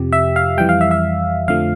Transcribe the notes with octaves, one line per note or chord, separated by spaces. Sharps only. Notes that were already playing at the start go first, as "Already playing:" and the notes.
Already playing: F2 C3 F3 G4
E5
F5
F2 E3 G3 G5
F5
E5
E5
F2 D3 F3 A3 F5